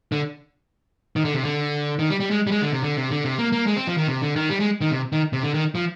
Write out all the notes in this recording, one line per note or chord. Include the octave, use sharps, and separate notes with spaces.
D3
D#3
D3
C3
D3
D#3
G3
G3
G#3
G3
G#3
D3
C3
D3
C3
D3
C3
A#3
A#3
G#3
C4
F3
D#3
C3
D3
D#3
G3
G#3
D#3
C3
D#3
C3
D3
D#3
F3